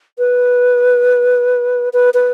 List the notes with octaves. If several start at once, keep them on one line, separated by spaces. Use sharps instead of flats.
B4
B4
B4